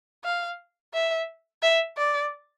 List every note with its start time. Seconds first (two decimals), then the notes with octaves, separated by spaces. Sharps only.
0.24 F5
0.94 E5
1.62 E5
1.97 D5